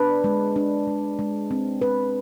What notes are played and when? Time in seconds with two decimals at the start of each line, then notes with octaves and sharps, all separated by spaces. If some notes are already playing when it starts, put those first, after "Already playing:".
Already playing: D4 B4
0.24 G#3
0.56 D4
0.87 G#3
1.19 G#3
1.51 C4
1.81 B4